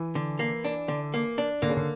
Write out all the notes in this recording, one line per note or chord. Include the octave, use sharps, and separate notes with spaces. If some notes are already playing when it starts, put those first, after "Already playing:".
Already playing: E3
D3
A#3
D4
D3
A#3
D4
D3 A#3
C#3
D3